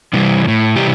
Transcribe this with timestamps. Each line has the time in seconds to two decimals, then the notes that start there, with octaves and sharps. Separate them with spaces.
0.13 C3 E3 G3
0.44 G3
0.48 A2
0.76 C3 E3 G3 G4